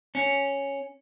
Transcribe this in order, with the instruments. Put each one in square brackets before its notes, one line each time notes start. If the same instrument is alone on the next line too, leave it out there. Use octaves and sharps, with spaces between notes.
[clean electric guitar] C#4